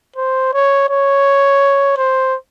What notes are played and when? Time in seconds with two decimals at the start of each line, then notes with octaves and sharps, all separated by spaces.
0.16 C5
0.53 C#5
0.89 C#5
1.97 C5